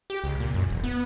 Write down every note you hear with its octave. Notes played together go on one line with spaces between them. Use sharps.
G4
C#2
A#2
F#2
E1
B3